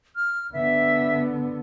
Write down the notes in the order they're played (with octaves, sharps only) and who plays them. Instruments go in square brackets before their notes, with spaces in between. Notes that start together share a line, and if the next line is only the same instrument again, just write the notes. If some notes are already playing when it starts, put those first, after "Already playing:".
[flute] F6
[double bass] D3 B3 [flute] E5